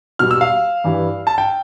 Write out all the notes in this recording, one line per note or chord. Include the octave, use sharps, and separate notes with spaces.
B2 G3 F6
E6
F5
G2 E3 G3
A5
G5